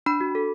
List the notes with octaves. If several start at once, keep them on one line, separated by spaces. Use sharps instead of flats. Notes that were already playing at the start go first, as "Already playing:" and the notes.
D4 B5
F#4
A4